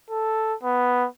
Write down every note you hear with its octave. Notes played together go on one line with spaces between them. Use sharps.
A4
B3